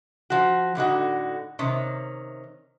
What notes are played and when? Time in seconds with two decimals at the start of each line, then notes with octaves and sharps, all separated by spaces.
0.30 F3 F#4
0.75 A2 D3 D#4 F#4
1.59 C3 D#3 C#4